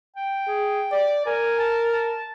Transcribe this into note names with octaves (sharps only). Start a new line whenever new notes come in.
G5
G#4
D5
A#4 G#5
A5
A5